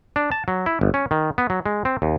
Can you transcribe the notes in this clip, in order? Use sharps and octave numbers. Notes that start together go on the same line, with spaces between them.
D4
A5
F#3
E4
G1
C#4
D#3
B3
F#3
G#3
C4
D#2